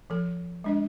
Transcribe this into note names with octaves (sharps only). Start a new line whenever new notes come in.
F3 A4
G#3 D4 D#5